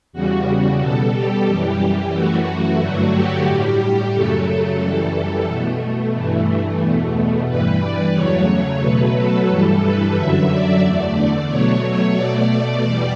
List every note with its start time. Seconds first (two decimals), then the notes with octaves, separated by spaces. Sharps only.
0.13 E2 C#3 G3 F#4
0.46 F#4
0.80 B2 G3 A4
1.13 G4
1.47 F#2 E3 G3
2.13 F#2 E3 A3 F#4
2.47 F#4
2.80 G2 D3 F#3 A3 F#4
3.13 G4
3.47 A2 G3
4.14 F#2 C#3 F#3 A3 A4
4.80 F#2 E3 G3
5.47 B2 A3
6.14 G2 E3 A3
6.81 E2 B2 A3
7.48 G2 E3 G3 B4
7.81 D5
8.14 E2 C#3 F#3 A3 C#5
8.81 B2 F#3 A3 B4
9.14 A4
9.48 G2 E3 G3 A4
9.82 B4
10.15 F#2 D3 F#3 E5
10.49 D5
10.81 E2 D3 A3 D5
11.48 B2 F#3 A3 C#5
12.15 B2 A3 D5
12.49 D5
12.82 E2 B2 G3